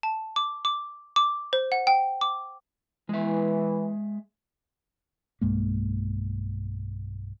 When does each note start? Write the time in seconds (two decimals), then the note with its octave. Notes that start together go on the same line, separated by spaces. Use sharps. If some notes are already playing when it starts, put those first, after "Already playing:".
0.03 A5
0.36 D6
0.65 D6
1.16 D6
1.53 C5
1.72 F#5
1.87 G5
2.21 D6
3.09 E3 G#3 E5
5.41 B1 G2 G#3 A#3